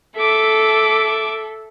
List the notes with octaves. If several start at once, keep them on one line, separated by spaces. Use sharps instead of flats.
A4 E5 D6